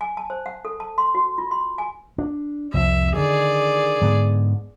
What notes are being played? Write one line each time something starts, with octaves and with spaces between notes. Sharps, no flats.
G#5
A5
C5
F#5
A4
A5
C6
F#4
F4
C6
G#5
D4
C2 F2 E5
D3 D#3 G#4 D5
G#2 D3 B3